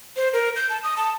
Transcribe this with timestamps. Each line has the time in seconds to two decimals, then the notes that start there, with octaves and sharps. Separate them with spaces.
0.16 C5
0.33 A#4
0.56 G6
0.70 A5
0.83 D#6
0.97 A5